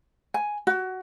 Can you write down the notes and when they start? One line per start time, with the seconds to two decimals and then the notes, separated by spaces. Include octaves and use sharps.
0.34 G#5
0.67 F#4